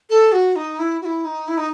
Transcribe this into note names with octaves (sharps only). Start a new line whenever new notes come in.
A4
F#4
D#4
E4
F#4
E4
D#4
E4
D#4